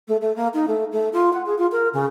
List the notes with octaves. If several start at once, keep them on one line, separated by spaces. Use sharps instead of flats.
A3
A3
A#3
D#4
A3
A3
F4
F#5
G#4
F4
A#4
C#3